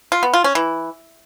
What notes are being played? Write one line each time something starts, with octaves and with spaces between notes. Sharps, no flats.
F4
B3
F4
C#4
E3